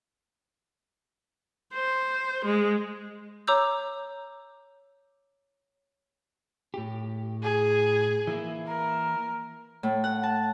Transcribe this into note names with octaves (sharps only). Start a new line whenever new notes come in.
C5
G#3
C#5 A#5 D6 E6 G6
A2 G4
G#4
E3 A#3 E4
A#4
A2
F#5
A5